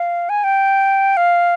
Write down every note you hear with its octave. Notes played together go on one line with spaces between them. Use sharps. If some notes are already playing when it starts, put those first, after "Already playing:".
Already playing: F5
G#5
G5
F5